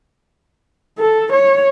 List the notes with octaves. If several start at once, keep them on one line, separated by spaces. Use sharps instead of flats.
A4
C#5